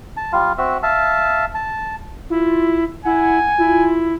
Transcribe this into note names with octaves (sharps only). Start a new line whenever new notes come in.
A5
G3 F4 F5
C4 F#4 E5
E5 F5 A5
A5
E4 F4
E4 F#5 G#5
E4 F4